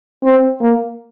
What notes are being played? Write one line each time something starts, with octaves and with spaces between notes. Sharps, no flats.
C4
A#3